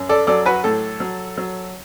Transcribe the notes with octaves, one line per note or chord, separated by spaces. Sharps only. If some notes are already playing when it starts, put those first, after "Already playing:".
Already playing: F#2
A4 D5
F#3 A4 D5
F#4 B4
A2 A4
F#3
F#3